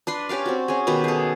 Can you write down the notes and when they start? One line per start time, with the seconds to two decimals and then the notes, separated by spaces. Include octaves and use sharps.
0.07 D4 B4 C6
0.29 C#4 G4 D5 F5
0.46 C4 F#4
0.68 C#4 G#4
0.87 B2 D#3 G4 B4
1.04 G#4 A4